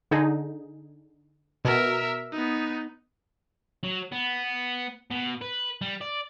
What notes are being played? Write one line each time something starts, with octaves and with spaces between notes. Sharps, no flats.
D3 D#4 G#4
B2 A#4 E5
B3 D#4
F#3
B3
B2
B4
G3
D5